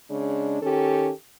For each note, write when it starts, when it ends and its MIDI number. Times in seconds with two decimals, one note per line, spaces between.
0.10 0.58 49
0.10 0.58 56
0.10 0.58 62
0.61 1.10 51
0.61 1.10 61
0.61 1.10 67
0.61 1.10 69